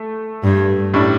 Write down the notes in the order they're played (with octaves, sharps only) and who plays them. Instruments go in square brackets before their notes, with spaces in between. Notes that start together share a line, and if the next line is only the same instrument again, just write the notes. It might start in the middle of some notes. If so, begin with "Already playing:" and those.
Already playing: [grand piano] A3
[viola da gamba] G2
[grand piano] A2 G3 D4